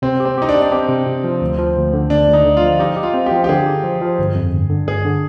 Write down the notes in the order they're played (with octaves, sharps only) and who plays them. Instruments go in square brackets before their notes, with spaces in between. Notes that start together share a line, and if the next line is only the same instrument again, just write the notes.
[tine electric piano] C3 [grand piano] C4
[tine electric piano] G4
[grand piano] C4
[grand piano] D#4 [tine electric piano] G4
[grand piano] D4
[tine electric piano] G4
[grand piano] D4
[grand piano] C4 [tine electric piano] G4
[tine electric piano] C3
C3
F3
D2
F3
D2
D3
[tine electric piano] D2 [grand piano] D4
[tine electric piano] D2
[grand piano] D#4
[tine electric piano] D3
[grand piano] F4
[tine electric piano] F3
[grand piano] D#4 [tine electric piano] G4
[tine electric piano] G4
[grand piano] F4
[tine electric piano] C4
[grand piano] G4
[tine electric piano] F3
[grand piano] G4
[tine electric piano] D3 [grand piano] G#4
[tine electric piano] G4
F3
F3
G1
F2
G1
D3
[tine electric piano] G1 [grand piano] G#4
[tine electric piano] D3